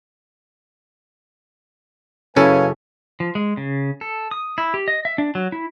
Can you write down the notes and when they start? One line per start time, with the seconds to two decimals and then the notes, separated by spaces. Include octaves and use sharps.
2.36 F#2 C#3 A#3 C#4 E4 A4 B4 G#5
3.20 F3
3.35 G#3
3.57 C#3
4.01 A4
4.31 D#6
4.58 E4
4.74 G4
4.88 D#5
5.05 E5
5.18 D4
5.35 F#3
5.52 E4